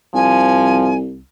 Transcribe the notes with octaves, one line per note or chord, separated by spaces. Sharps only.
C2 F3 G#5